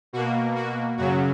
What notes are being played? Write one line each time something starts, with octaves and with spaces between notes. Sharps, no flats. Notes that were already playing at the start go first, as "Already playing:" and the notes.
B2 A#3 F#4
F#4
F#2 C#3 F#3 F#4